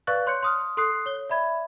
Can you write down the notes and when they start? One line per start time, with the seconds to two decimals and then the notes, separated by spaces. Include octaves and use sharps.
0.07 B4 D5 F5 C#6 F#6 A6
0.26 C#5 C6 F#6 G6 C#7
0.42 C6 D#6 F6
0.77 A4 C6 D#6 F#6 C7
1.06 C#5 G7
1.29 D5 E5 B5 G#6